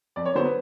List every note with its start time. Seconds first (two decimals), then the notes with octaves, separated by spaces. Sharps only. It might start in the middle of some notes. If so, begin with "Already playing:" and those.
0.16 F2 D5
0.26 C#5
0.35 D3 F#3 B3 C5
0.45 B4